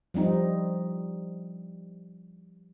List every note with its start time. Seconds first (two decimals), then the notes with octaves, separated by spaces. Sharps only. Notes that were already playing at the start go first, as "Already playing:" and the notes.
0.14 F3 G3 C4 D#4